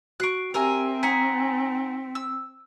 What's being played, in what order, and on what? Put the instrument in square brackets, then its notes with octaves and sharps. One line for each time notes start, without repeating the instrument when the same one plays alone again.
[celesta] F#4 C7 D7 [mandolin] C#6 F#6
[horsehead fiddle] C4 [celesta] G4 [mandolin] A#4 E5 G#5
[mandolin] D#4 F#5 G#5 [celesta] B6 C#7
[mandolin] E6